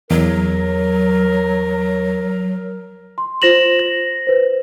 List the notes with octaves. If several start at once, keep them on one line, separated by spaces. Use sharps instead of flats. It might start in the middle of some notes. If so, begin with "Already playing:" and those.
E2 F#3 A#4
C6
F4 C5 A#6 E7 F#7
A#6
B4 C5